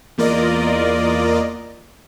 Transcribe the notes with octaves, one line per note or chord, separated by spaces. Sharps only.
E2 A#3 F4 A#4 D5 D#5